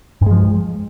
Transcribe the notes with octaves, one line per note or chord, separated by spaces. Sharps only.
G2 F3 G#3